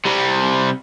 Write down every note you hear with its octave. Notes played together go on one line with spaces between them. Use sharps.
C3 G3